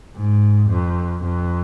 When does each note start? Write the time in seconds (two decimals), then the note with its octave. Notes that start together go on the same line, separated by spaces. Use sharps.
0.16 G#2
0.69 F2
1.23 F2